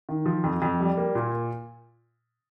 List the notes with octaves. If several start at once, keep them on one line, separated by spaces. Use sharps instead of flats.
D#3
F3
F2
F2
G3
A#3
A#2